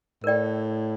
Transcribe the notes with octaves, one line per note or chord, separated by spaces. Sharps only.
A2 A#4 D5 G5